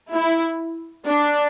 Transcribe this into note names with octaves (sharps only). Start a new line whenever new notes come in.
E4
D4